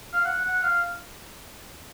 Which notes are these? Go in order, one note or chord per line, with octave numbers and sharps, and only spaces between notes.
F5
F#5
F#5
F5